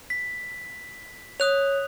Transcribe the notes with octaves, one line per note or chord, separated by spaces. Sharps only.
B6
C#5 D#6 F#6 F7